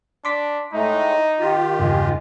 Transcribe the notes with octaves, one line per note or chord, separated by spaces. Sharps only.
D4 C6 D6 B6
A2 G#3 A3 D#4
D#3 F4 G4
E2 G2 C#3 G#3